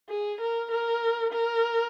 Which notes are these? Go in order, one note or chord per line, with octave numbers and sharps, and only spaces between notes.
G#4
A#4
A#4
A#4